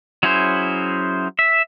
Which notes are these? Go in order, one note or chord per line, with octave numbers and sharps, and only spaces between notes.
F#3 C#4 E4 G#4 C5
E5